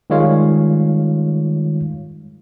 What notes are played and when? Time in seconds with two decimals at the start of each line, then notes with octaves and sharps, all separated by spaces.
0.10 D#3 G3 G#3 F4 C#5 F5